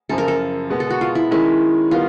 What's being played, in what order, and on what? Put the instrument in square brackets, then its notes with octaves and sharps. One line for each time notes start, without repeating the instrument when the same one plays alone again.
[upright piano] F#2 C#3 F3 [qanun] A4
[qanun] A#4
A4
[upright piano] B2 G#3 B3
[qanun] A4
F#4
F4
E4
[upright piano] D#3 G#3 C#4 [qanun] E4
[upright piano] D#3 G3 B3 [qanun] F4